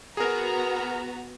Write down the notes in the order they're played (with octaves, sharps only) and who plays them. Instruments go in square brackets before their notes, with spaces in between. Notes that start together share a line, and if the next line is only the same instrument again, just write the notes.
[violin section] B3 F#4 A#5 [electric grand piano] G#4 A#4